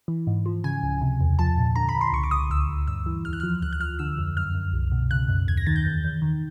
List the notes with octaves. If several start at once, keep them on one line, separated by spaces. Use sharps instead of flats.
E3
G#2
F3
C#3 G#5
C#2
C3
E2
F3 A5
A#2
D3 A#5
B5
D3
C6
C#2 C#6
D6
C#2 D#6
D2 E6
D2
G2 E6
E3
E2 F6
F#6
F6
F3
D2 F#6
F#6
F3 F6
D3 E6
F2
F#2 F6
F#2
C2
B2
C#3 F#6
F#2
D#2 G#6
A#6
D#3 A6
G6
E2
E2
D#3